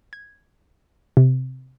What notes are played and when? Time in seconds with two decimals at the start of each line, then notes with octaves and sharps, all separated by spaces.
0.13 G#6
1.17 C3